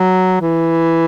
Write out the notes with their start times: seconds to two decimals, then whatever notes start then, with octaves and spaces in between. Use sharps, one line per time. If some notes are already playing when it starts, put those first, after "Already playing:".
Already playing: F#3
0.41 E3